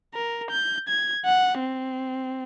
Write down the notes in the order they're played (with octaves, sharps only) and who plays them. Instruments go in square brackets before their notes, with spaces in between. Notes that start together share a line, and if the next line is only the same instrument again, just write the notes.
[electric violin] A#4
G6
G#6
F#5
C4